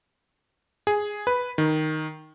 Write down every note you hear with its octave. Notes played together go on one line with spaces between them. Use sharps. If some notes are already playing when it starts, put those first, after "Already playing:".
G#4
B4
D#3